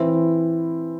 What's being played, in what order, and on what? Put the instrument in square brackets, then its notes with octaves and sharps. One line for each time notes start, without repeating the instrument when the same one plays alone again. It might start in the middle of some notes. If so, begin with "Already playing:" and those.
Already playing: [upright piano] E3 C4 E4